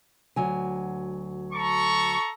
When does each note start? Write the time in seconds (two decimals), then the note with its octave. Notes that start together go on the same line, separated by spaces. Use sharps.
0.36 D2 F#3 G#5
1.53 A4 A#5 C#6